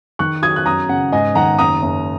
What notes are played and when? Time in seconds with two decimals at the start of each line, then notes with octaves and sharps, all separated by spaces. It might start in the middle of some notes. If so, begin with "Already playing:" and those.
0.19 D#3 C#6 F#6
0.42 F#3 D#6 G#6
0.56 F#6
0.66 F#2 A#5 D#6
0.89 C#3 F#5
1.12 G#2 D#5 G#5
1.35 D#3 F#5 A#5
1.59 F#1 A#5 D#6
1.82 F#1